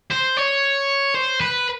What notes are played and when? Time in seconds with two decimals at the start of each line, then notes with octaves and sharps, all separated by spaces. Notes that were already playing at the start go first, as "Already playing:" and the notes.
0.11 C5
0.37 C#5
1.15 C5
1.41 B4